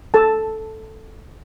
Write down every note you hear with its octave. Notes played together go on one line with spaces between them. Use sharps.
A4 A5